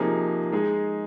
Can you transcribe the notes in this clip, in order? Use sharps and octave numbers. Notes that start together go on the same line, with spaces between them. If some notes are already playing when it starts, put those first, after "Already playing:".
Already playing: C3 F3 A#3 D#4 G#4
G#3 D#4 G#4